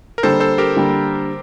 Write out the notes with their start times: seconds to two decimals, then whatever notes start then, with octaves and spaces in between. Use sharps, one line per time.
0.18 A#4
0.23 D3 G3 A#3 A4 C5
0.40 A4 C5
0.58 G4 A#4
0.76 D3 G3 A#3